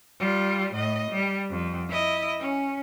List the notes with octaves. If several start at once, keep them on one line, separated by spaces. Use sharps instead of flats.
G3 F4
A2 D#5
G3
F2
E4 D#5
C#4